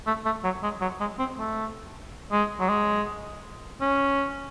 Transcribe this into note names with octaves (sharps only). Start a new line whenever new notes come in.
A3
A3
F#3
G#3
F#3
G#3
C4
A3
G#3
F#3
G#3
C#4